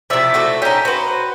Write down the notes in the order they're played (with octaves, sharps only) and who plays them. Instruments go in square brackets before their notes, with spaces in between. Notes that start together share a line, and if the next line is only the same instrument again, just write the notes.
[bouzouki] C3 F3 [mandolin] E4 D5 E5
[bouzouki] A3 F#4 A4
[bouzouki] C#4 D#4 [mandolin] G4 D#5
[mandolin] F#4 B4 [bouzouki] C5